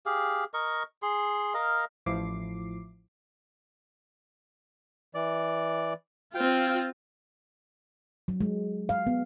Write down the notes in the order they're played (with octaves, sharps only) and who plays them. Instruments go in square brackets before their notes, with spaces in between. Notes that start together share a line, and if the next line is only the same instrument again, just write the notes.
[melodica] G4 G#4 F5
A#4 D#5 C#6
G#4 C6
A#4 D#5 F5
[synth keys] A1 F3 E4 D6 C7
[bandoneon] E3 D5
[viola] C4 F4 [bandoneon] F5 G5
[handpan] F#3
G#3
F5
B3